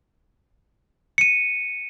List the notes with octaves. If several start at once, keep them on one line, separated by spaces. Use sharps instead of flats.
C#7 D#7